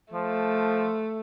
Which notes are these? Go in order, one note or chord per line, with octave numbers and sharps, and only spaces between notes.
F3 A3